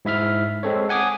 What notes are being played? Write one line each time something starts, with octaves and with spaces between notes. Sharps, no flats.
G#2 E4 E5 F6
G#3 C4 A4 C#5
F#5 G#5 D6 D#6